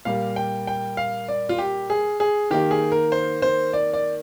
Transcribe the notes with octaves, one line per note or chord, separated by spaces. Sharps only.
A#2 G3 A#3 F5
G5
G5
F5
D5
F4
G4
G#4
G#4
D#3 A#3 G4
G#4
A#4
C5
C5
D5
D5